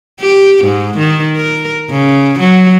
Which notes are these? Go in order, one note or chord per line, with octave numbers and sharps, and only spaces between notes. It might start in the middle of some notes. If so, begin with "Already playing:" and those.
G4
G#2
D#3
A#4
C#3
F#3